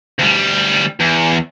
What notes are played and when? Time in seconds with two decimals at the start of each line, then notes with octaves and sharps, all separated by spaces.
0.19 D2 G3
1.00 E2